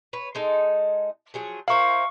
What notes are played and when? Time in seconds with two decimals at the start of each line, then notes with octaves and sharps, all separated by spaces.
0.13 B4 C#5
0.35 G#3 D#4 A4
1.34 F3 F#3 G#4
1.68 E4 A#4 C5 F5 C#6